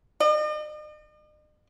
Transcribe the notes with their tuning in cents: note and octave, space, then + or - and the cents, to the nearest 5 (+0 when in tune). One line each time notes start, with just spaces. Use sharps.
D#5 -45